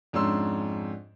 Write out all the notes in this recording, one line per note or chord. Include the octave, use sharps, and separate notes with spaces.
F2 G#2 C#4 D4 C6 E6